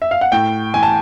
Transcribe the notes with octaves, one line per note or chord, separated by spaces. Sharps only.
E5
F5
F#5
A2 G5
E3 G#5
A5